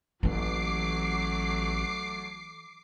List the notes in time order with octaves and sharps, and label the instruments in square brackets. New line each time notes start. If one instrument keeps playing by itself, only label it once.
[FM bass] A1 [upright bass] E3 A#3 [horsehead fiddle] F#3 A3 [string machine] D6 C7